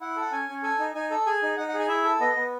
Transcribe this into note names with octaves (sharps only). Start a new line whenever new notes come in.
E4 F#5
A4 F#5
C#4 G#5
C#4
A4 G#5
D#4
D#4 G#5
A4
G#4 G#5
D#4
D#4 F#5
F#5
G#4
G#5
E4 E5
A4
B3 D#5
B3